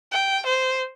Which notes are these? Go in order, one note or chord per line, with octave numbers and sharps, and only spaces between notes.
G5
C5